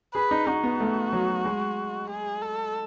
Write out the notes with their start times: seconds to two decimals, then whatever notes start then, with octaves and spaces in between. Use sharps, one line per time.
0.15 G#4 B4
0.31 D#4
0.47 D#4 F#4
0.64 B3
0.80 A3
1.13 F#3
1.45 G#3
2.10 G#4
2.42 A4